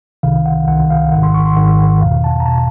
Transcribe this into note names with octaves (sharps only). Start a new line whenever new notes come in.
C2 C3 D#3 F5
F#5
C2 C3 D#3 F#5
F5
G#1 G#2 D#3 F#5
C6
C#6
C6
G#1 G#2 D#3 F#5
F#5
E2 B2 F5
A5
A#5
B2 A5